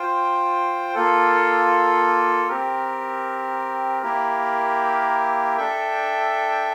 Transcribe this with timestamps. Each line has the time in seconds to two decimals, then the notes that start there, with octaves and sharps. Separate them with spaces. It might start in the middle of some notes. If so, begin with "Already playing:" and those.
Already playing: F4 C5 G5
0.95 A#3 F4 A4
2.49 C4 G4 A#4
4.03 A#3 E4 G4 A#4
5.57 D4 A4 E5 G5